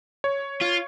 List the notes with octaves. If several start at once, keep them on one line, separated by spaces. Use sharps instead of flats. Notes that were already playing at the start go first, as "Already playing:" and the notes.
C#5
F4